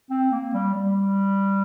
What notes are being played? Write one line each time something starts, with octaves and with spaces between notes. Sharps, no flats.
C4
A#3
G3
G3